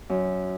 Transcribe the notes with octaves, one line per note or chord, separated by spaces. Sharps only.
F#2